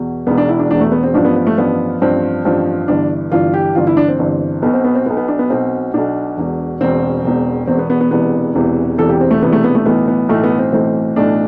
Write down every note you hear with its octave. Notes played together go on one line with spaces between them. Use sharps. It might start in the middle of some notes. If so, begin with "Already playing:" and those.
Already playing: E2 B2
E1 E2 B2 B3
D4
E4
D4
E1 E2 B2 D4
A3
B3
C4
A1 G2 F3 D4
B3
B3
A3
A1 G2 F3 B3
A1 G2 F3 C4
A1 G2 F3
G1 G2 E3 D4
G1 G2 E3 F4
G4
G1 G2 E3 F4
E4
D4
C4
G1 G2 E3
B1 B2 B3
C4
B3
C4
B1 B2 B3
B3
D4
B3
B1 B2 C4
B1 B2 D4
E1 E2 B2
E1 E2 B2 C4
E1 E2 B2
E1 E2 B2 C4
B3
B3
B3
E1 E2 C3 E3 B3
E1 E2 C3 E3
E1 E2 C3 E3 A4
G4
C4
A3
E1 E2 C3 E3 B3
A3
B3
A3
B1 A2 E3 B3
B3
B1 A2 E3 A3
B3
C4
B1 A2 E3 C4
B1 A2 E3 D4